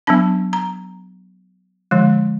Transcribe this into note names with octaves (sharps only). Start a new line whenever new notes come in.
F#3 B3 D4 A5
A#5
D3 F3 G#3